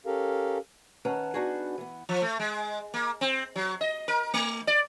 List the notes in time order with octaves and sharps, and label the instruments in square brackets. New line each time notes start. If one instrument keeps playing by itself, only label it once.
[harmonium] C#4 G4 A4 A#4 F5
[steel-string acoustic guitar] D#3 C#4 B4 F#5 A5 A#5
B3 D4 D#4 F#4 G#4
E3 B3
[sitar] F3
A3
G#3
A#3
C4
F#3
D#5
A#4
A3
D5